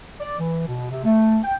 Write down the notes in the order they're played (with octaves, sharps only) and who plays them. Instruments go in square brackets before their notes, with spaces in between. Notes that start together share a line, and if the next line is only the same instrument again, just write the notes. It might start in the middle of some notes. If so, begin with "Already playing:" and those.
[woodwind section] D5
E3
B2
C3
A3
G5